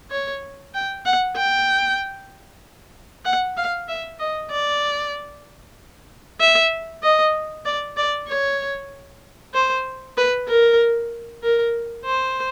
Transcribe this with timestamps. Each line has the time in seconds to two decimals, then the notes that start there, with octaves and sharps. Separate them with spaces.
0.11 C#5
0.74 G5
1.06 F#5
1.37 G5
3.25 F#5
3.57 F5
3.88 E5
4.20 D#5
4.51 D5
6.40 E5
7.03 D#5
7.65 D5
7.97 D5
8.28 C#5
9.54 C5
10.17 B4
10.48 A#4
11.43 A#4
12.06 C5